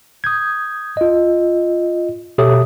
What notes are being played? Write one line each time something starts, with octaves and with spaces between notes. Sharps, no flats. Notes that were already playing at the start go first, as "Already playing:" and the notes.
D#6 G6 G#6
F4 D#5
B2 G4 A4 C#5 E5 D#6